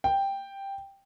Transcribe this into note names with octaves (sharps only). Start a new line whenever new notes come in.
G5